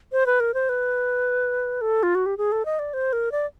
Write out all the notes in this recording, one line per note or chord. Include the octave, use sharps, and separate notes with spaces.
C5
B4
A#4
C5
B4
A4
F4
F#4
G4
G#4
A4
D#5
D5
C5
A#4
D5